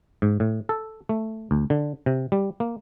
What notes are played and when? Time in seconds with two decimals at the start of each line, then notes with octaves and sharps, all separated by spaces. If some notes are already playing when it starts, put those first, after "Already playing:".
0.22 G#2
0.40 A2
0.69 A4
1.09 A3
1.51 D2
1.70 D3
2.06 C3
2.32 G3
2.60 A#3